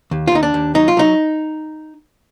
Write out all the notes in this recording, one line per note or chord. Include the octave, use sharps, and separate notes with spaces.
D#2
F4
D#2 D#4
D4
D#2
F#3 D#4
F4
F#3 D#4